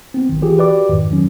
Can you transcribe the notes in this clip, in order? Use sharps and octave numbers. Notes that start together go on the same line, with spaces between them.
B3 C4
G#1 D#3
E3 F4 G4 G#4
F#4 G4 B4 D5 D6
F2 G#2 D#3
D#3 F#3 C#4